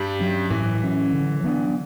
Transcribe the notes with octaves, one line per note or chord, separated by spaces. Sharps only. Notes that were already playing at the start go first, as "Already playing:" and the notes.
Already playing: G2 G3
F#3 C#4
A2 E3
F#3 C#4
D3
F#3 B3 D4